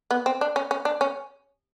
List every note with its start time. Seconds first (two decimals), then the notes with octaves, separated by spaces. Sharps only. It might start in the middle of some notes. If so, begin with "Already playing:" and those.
0.11 B3
0.26 C4
0.41 D4
0.56 C#4
0.71 C#4
0.85 D4
1.01 C#4